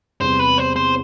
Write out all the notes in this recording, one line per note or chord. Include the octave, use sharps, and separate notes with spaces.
E2 C3 G3 B3 C5
B4
C5
C5